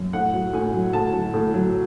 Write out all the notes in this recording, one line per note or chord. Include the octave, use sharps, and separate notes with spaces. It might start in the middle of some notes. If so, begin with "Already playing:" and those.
Already playing: F#2
A2 F#5
F#3
A2 G#5
F#3
A2 A5
F#3
A2
F#3